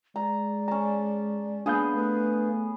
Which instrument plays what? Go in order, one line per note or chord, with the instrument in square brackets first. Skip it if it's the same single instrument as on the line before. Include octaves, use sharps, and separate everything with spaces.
[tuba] G#3 [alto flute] D5 [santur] A#5
[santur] C#4 A5 [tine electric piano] A#5
[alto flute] A#3 [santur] B3 G#4 [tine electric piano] D4 F5 G6
[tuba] A3 [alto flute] B4